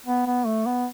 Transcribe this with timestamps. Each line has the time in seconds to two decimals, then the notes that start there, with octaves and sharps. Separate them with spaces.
0.06 B3
0.27 B3
0.46 A3
0.66 B3